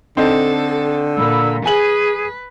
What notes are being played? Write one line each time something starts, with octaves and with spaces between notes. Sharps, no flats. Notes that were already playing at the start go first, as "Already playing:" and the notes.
D3 C4 D#4 A4
A#2 B5 E6
G#4 B4 G#5 F#7